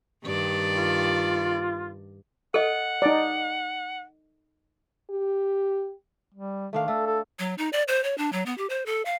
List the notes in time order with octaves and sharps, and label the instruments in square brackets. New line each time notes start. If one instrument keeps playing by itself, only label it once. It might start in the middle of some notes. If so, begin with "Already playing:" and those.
[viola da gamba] G2 D#3 D5
[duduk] F4
[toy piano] A4 D#5 [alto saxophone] F#5
[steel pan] D#4 D5
[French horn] G4
[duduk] G3
[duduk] D#3 [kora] A3 D4 F5
[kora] A3 [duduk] A4
[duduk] A4
[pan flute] F#3
D#4
D5
C5
C#5
D4
F#3
B3
G4
C5
A4
F5